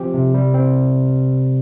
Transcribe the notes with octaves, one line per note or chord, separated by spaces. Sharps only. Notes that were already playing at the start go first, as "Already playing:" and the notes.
Already playing: F3 C4 G4
C3
G3
C4